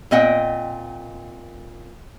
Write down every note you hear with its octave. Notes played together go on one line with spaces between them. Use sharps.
A#2 C4 D#5 F#5 G5